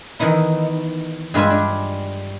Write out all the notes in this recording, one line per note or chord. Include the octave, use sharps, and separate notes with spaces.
D#3 E3 B3 D#4 E4
G2 G#3 F4 B4 E5 G#5
D4